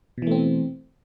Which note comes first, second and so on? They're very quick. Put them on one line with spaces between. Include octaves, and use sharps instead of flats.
B2 E3 A3 C4